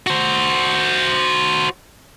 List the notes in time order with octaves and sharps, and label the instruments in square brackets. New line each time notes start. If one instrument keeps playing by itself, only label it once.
[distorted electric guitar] F#4 C5